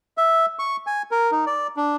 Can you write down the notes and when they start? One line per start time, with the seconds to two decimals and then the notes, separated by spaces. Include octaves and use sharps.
0.17 E5
0.59 C#6
0.87 G#5
1.11 A#4
1.31 D#4
1.46 D5
1.76 D4